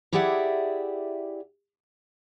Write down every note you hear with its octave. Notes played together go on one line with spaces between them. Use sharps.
E4 G4 G#4 D5 E5 F#5